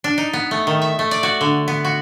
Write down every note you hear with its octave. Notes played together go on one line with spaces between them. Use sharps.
D4
D#4
B3
A3
D#3
E5
A3
D5
F#4
D3
B3
F#4